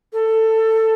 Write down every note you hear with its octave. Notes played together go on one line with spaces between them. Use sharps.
A4